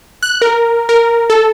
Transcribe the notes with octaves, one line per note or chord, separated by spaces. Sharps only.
F#6
A#4
A#4
A4